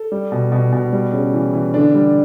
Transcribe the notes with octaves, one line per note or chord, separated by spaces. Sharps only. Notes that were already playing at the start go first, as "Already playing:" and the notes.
Already playing: A4
G3
B2
B2
B2
G3
C#3
E3
E3
D3 D4
G3